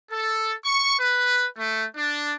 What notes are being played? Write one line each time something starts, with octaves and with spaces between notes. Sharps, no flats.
A4
C#6
B4
A3
D4